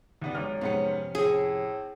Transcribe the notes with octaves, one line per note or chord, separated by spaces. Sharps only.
D#2 B3 D4
G#1 F#3 F6
F2 G#2 C3 B3 C#4 C#7
A2 C4 G#4